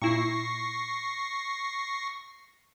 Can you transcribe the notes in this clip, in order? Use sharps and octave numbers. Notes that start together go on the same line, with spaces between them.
A#2 E4 C#6 A#6 C7